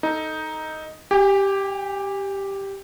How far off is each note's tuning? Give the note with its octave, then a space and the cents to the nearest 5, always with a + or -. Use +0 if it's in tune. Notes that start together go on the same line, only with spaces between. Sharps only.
D#4 +5 A4 +0
G4 +0 G#5 -40